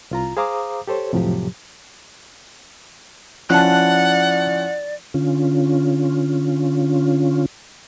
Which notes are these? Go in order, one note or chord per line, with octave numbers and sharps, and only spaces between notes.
C2 F4 A#5
G#4 C5 F5 A#5 D6 D#6
G4 A4 C5 C#5
F2 A2 C3 F3 F#3 G4
F3 C#4 E4 D5 F#5 A5 F#6
D3 C#4 F4